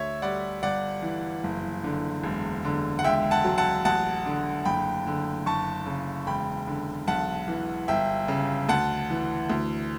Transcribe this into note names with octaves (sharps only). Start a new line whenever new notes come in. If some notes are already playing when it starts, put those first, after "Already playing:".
Already playing: D2 C#5 E5
G3 D5 F#5
G1 D5 F#5
E3
F#1
D3
E1
D3
F#5
C#2 E5 G5
F#5 A5
F#3
F#5 A5
A1 F#5 A5
D3
F#1 G5 B5
D3
F#1 A5 C#6
C#3
E1 G5 B5
D3
B1 F#5 A5
E3
G1 E5 G5
C#3
D2 F#5 A5
E3
D2